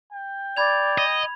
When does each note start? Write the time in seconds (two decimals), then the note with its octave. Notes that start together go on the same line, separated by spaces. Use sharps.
0.13 G5
0.57 D5 B5 G#6 F7
0.98 D#5